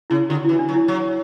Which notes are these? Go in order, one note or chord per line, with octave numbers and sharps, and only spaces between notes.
C#3 E4
D3 F#4
E4
E3
D4
F#3
E4
F#3